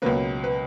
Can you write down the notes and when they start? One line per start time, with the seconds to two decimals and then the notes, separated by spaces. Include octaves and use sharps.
0.02 C#2 B2 F#3 A#3 B4
0.44 B4